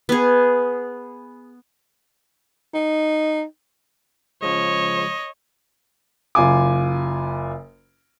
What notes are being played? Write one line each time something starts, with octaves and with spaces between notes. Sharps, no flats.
B3 G#4
D#4
C#3 F3 G#3 C#5 D#5
F#1 F4 G#5 D6